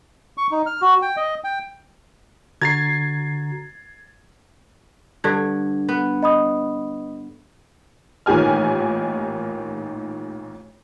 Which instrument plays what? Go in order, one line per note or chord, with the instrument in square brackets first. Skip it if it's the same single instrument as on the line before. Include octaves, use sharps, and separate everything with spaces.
[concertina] C#6
D#4
F6
F#4
G5
D#5
G5
[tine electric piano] D3 F#4 A#5 [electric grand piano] G#6 A6 C7
[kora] G2 D3 [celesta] G#6
[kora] B3
[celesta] D#5 B5 D#6
[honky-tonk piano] A1 A#2 D#3 G4 G#5 F6